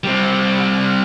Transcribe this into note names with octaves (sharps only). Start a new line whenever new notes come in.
G3 C4